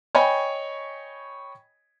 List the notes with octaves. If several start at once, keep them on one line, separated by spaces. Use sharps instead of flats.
C#5 D#5 G5 G#5 B5 C#6